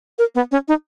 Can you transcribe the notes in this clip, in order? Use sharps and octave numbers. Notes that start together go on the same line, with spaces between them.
A#4
B3
C#4
D#4